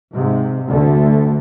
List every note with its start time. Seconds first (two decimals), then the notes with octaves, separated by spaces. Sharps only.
0.13 G#2 C3
0.69 D2 D3 A3